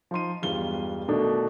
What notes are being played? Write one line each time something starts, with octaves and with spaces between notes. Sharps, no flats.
F3 D#4 C6 D#7
E1 G2 F4 G7
B2 D#3 A3 D4 A4